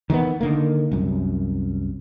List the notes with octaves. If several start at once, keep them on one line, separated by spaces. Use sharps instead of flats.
D#3 E3 G#3 B3
D3 D#3 A#3
C2 F#2